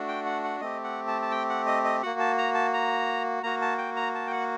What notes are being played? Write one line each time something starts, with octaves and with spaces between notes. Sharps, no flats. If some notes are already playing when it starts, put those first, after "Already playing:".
Already playing: A3 D4 F#4
G5
F#5
F#5
A3 C4 G4 D#5
F#5
A5
A5
G5
F#5
D#5
D#5
A#3 F#4 F#5
A5
A#5
A5
A#5
A#3 F#4 A#5
A5
G5
A#5
A5
G5
F#5